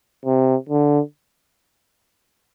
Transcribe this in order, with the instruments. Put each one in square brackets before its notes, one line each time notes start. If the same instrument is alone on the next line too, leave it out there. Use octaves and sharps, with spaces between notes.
[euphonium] C3
D3